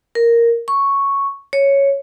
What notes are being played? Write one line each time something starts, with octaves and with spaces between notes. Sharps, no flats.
A#4
C#6
C#5